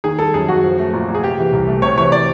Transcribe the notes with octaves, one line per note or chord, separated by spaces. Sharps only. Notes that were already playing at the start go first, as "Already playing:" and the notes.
D#3 G#4
G3 A4
F#2 G#4
F#2 F#4
F3
A3
A#2
A#2
G#4
C3 G4
E3
C2
A3
C3 C#5
E3 C#5
D5